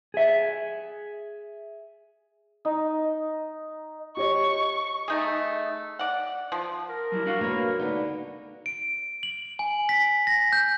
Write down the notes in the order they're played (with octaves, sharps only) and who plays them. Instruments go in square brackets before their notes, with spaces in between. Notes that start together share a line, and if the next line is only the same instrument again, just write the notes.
[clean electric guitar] G#4 E5
[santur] D#4
[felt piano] G4 C#5 D#5 [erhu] C#6
[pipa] A3 D#4 G#4
D5 F#5
F3
[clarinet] A#4
[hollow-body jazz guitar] F#3 G3 E4
D4 F#4 F5
[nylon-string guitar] A#3 B4 C#5
D3 B3 D#4
[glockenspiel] D7
F#7
G#5
B6
A#6
G6